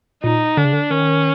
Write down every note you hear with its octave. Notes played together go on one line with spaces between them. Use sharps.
A#2 D#4
D3 D4
C#3
D3
D#3 C#4